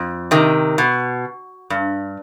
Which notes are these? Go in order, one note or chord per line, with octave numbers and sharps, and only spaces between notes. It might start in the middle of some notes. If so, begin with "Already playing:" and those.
Already playing: F2
C3 D#3
B2
G2